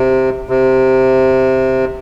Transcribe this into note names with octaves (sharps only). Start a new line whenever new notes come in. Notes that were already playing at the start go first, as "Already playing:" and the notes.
Already playing: C3
C3